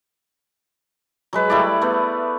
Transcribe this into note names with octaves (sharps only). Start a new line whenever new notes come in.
F#3 G#3 B4
G3 A3 E4 D5
A3 B3